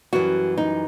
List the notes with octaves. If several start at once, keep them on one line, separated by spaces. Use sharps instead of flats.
F#2 E3 G3 F#4
D#4